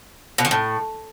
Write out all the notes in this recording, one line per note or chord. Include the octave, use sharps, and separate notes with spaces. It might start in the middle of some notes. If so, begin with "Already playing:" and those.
B2
D#3
A2